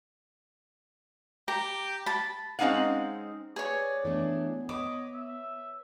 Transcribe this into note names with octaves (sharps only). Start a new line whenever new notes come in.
G4 A#5
A5 B5
G#3 C4 C#4 D#4 F5 F#5
G#4 B4 C#5 D5
E3 A3 B3 D4
B4 C#5 D#5 D6
E5